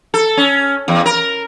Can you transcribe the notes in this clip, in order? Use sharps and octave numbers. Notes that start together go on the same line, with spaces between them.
A4
C#4
E2
A#4